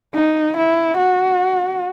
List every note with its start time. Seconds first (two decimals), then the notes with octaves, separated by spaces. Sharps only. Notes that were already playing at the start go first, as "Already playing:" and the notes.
0.15 D#4
0.57 E4
0.97 F#4